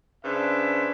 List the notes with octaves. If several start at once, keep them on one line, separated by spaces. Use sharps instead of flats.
C#3 D4 B4 C5 E5